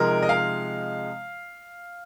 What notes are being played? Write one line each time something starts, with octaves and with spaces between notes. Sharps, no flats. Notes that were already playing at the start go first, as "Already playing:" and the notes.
Already playing: C3 F3 G#3 D#4 A#4
D#5
F5